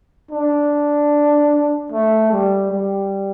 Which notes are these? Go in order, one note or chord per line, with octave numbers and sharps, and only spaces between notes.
D4
A3
G3
G3